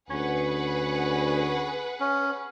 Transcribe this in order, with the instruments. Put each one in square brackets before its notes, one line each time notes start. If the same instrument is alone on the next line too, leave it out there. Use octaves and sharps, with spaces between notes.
[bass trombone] D2 [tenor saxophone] C#4 [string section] G#4 B4 F#5
[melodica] C#4